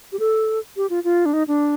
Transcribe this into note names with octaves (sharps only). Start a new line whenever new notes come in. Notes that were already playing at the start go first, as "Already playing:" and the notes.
G4
A4
G4
F4
F4
D4
D#4
D4